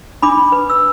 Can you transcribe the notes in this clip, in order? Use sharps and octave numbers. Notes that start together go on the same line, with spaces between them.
D4 B5 D6
B4
E6